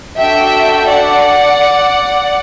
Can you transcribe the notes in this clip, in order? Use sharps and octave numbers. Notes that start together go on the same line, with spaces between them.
D4 F#4 A4 E5 G5
D5 F#5